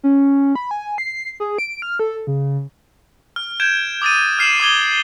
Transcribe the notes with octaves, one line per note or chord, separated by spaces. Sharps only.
C#4
B5
G#5
C7
G#4
D7
F6
A4
C#3
F6
G6 G#6 D7 E7
D6 D#6 A6 D#7
F6 C7 E7 F#7
D6 D#6 G#6 G7